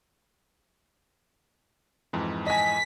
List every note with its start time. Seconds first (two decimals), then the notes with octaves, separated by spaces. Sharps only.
2.13 F2 G#2 E3
2.47 D#5 G#5 B6